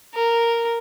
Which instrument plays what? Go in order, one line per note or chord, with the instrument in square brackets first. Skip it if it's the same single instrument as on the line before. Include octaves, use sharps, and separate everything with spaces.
[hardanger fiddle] A#4